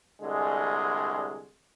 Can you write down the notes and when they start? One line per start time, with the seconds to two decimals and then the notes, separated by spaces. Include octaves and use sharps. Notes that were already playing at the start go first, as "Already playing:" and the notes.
0.22 C2 D3 G#3